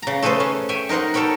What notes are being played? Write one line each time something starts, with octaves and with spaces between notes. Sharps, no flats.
C#3 A#5
A3 G#4 A4 B4 C5
C#4
C#5 E5 G5 G#5
D#4 A#4 C5 F#5 C6
A4 A#4 C#5 G5 B5